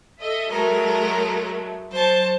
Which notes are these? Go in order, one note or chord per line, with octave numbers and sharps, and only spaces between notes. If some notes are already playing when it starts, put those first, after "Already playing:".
A4 D#5 E5
F#3 G#3 A3 A#4
F#3 C5 A5